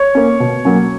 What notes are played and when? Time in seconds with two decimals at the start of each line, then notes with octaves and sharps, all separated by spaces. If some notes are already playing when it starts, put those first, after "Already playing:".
Already playing: C#5
0.15 A#3 C#4
0.40 B2
0.65 F#3 A#3 C#4